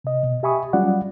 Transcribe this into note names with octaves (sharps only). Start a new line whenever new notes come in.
C3 D#5
B2
G4 E5 G#5 B5 C#6 D#6
F#3 G3 C#4 F4 D5 F#5